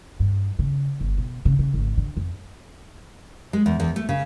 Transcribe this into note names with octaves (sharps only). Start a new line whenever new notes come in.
G2
C#3
G1
B2
C#3
C#3
G#1
D3
F2
G#3
E2
E2
A3
C#3